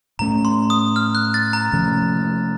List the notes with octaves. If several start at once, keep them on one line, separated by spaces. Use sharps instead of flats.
A2 A3 C#4 A#5
C6
D#6
F6
F#6
A6
A#5
C3 F3 A3 C#4